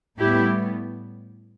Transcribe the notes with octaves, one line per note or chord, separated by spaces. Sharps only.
A2 G3 B3 E4 G4